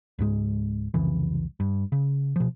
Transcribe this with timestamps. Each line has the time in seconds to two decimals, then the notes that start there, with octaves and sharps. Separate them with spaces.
0.19 C#2 G#2 G#3
0.94 C2 F2 C#3 E3
1.60 G2
1.92 C#3
2.36 B2 F3